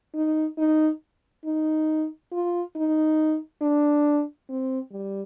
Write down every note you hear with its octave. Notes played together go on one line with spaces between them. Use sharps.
D#4
D#4
D#4
F4
D#4
D4
C4
G3